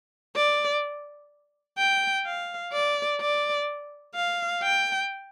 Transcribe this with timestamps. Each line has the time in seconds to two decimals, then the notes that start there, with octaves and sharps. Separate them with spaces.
0.36 D5
1.78 G5
2.26 F5
2.73 D5
3.21 D5
4.15 F5
4.63 G5